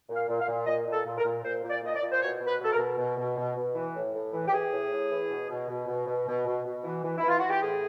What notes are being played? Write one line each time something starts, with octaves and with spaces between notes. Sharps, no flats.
A#2
F5
A#2
F5
A#2
A#2 D#5
A#2
A4
A#2
A#4
A#2
A#2 C5
A#2
D5
A#2 D#5
D5
A#2
C5
B2 C#5
B2
B4
B2 A4
A#4
B2
B2
B2
B2
B2
E3
A2
A2
E3
G4
E3 G#4
A2
A2
E3
B2
B2
B2
B2
B2
B2
B2
B2
E3
E3
E3 E4
F4
E3 F#4
G4
A2 G#4